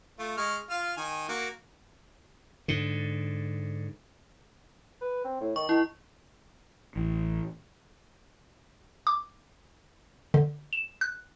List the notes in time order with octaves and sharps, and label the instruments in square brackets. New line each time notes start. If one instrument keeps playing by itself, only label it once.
[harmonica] A3 F4
G#3 C#6 F6
F4 F6
D#3 G#5
A#3 F#4
[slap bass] G#2 D3
[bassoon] B4
C4
A2
[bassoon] D#3 [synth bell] C#6
[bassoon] D#3 [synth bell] E4
[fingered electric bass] A1
[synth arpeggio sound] D6
D3
E7
F#6